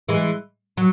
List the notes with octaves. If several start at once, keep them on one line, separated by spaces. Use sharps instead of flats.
E3 G#3
F#3